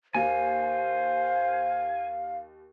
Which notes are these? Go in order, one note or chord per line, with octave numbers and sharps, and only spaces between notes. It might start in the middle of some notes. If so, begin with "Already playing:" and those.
D#2 C5 F5 G#5